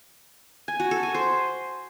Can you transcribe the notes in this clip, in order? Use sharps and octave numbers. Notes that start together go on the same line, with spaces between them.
G#5
F#4
A4
G#5
C5